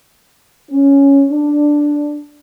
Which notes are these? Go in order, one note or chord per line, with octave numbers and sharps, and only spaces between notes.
C#4
D4